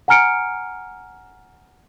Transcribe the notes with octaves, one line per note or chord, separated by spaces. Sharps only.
F#5 G#5 A#5 F6 C#7 D7